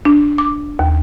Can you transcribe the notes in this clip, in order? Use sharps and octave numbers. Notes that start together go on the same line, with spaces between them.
D4
D6
D#2